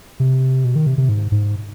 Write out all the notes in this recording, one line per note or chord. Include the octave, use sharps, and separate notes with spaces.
C3
B2
D#3
C3
C3
G#2
G#2